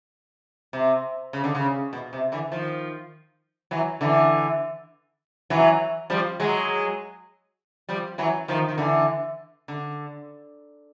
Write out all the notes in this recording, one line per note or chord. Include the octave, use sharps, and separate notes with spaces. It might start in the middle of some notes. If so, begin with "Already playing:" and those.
C3
C#3
D3
C#3
B2
C3
D3 E3
D#3 F3
E3 F#3
D3 E3
E3 F#3
F3 G3
F#3 G#3
F3 G3
E3 F#3
D#3 F3
D#3
D3 E3
D3